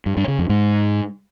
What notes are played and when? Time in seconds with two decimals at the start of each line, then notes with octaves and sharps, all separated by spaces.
0.06 G2
0.17 G2
0.28 C#3
0.39 F2
0.49 G#2